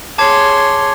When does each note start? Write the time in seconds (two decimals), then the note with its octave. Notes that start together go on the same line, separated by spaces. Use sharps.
0.18 G#4 C#5 A5 C6 D6 G#6